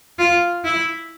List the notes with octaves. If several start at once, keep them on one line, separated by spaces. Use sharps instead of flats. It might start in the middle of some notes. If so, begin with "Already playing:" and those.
F4
E4